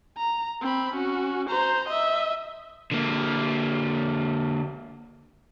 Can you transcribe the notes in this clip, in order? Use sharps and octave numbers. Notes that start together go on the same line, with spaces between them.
A#5
C4 B5
C#4 F#4
C5 A#5
D#5 E5
D3 A#3